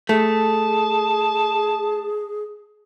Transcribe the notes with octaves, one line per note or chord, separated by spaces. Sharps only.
A3 G#4 A5